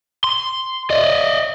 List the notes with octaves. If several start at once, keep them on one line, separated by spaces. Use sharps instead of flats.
C6
D5 D#5